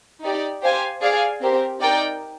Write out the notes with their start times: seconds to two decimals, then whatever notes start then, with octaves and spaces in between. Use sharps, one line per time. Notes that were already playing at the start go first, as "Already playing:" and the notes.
0.23 D#4 G4 D5
0.63 G4 C5 F5 G#5
1.01 G#4 D5 F5 G#5
1.41 C4 G4 A#4
1.81 D#4 A#4 D5 G5